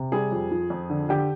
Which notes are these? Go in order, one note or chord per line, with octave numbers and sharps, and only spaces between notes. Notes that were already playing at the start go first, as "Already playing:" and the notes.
Already playing: C3
G3 G#4
F2
F3
F2
D3
D3 G4